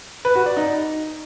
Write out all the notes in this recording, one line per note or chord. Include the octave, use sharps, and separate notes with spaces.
B4
F#4
D5
D#4